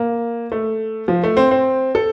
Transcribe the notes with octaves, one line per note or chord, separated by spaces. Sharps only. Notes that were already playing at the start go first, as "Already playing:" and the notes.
Already playing: A#3
A3
F3
A3
C4
C4
A4